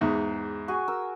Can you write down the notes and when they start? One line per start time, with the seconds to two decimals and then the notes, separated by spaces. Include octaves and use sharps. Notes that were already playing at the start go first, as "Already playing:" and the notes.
0.01 E2 G#2
0.68 F#4 G#4 G#5
0.88 A#4 E6